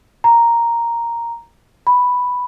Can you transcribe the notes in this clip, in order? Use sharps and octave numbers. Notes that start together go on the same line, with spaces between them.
A#5
B5